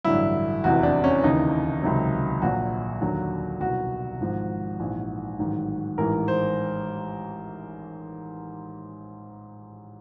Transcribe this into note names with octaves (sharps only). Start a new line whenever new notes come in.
A1 G2 D3 F#3 E4
F1 E2 C3 E3 F#4
D4
C#4
D#2 C#3 E3 D#4
C#2 C3 D#3 F#3
A#1 A#2 F#3 F#4
D#2 D3 F#3
C2 B2 F#3 F#4
G#1 G#2 F3
A#1 G#2 E3
A1 G#2 D#3 F#3
A1 G#2 E3 A#4
C5